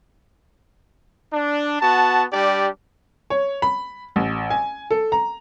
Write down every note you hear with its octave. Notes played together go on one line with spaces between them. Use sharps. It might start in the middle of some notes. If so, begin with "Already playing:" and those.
D4
B3 F#4 A5
G3 D4 G4 D5
C#5
B5
A1
G#5
A4
A#5